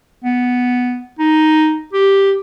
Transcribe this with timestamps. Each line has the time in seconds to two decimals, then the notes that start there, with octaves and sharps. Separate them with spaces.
0.24 B3
1.19 D#4
1.93 G4